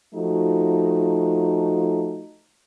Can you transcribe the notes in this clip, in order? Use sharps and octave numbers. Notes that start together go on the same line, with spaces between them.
F3 A3 D#4 F#4